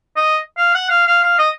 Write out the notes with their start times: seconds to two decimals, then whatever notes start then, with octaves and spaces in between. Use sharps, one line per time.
0.17 D#5
0.58 F5
0.74 F#5
0.90 F5
1.07 F5
1.23 F5
1.39 D#5